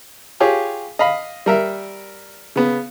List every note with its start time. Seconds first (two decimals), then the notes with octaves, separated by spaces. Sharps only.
0.40 F4 G4 G#4 C#5
0.99 D#5 F5 B5
1.46 G3 A#4 E5
2.56 C#3 B3